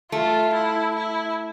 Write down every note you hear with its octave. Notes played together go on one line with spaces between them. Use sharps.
A3 F4
E4
E4